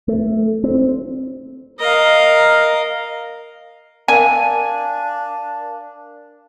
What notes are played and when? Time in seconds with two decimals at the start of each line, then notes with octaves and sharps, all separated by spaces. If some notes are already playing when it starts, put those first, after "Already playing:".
0.08 A3
0.64 C4
1.80 A#4 D#5 F5
4.08 D4 A#4 F5 G#5